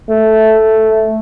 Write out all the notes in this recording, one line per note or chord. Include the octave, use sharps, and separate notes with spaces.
A3